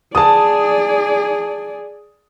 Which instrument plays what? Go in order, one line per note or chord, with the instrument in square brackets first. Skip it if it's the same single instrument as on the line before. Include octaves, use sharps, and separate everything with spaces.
[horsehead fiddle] G#4 D5 [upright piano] A5 D#6